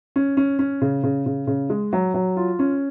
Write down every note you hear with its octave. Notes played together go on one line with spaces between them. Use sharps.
C#4
C#4
C#4
C#3
C#3
C#3
C#3
G#3
F#3
F#3
F4
C#4